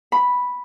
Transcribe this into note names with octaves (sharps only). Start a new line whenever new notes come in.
B5